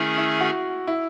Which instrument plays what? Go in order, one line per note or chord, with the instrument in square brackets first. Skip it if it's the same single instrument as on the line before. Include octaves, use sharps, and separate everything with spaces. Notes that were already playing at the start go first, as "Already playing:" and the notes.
Already playing: [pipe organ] D#3 A3 C#4 G#4 [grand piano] E4
[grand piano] E4
F#4
E4